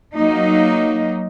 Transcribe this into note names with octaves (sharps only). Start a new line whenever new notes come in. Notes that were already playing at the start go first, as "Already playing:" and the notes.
F#3 A#3 D#4